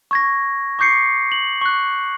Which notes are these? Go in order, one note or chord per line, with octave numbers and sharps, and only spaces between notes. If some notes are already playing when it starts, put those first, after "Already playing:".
C#6 G#6 A#6
C#6 D6 G6 C7 C#7
F#7
C#6 F#6